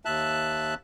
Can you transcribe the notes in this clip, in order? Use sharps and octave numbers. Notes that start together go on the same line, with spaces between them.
D#2 E5 A5 F#6